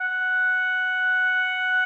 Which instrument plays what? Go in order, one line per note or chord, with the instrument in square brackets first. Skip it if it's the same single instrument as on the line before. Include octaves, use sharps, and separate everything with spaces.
[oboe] F#5